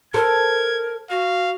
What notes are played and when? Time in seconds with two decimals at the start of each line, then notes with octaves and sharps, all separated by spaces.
0.14 A4 A#4 C5 G#6
1.10 F#4 F5